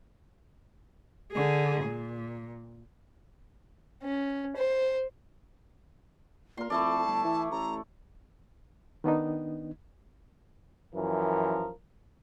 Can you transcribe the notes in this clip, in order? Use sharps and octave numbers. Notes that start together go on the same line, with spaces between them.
D3 G#4
A#2
C#4
C5
A#2 A#4 C6
F2 A3 E4 D5 A5
G1
E3
A1 A#5
D#3 B3 D4 D#4
F#2 E3 F3 A#4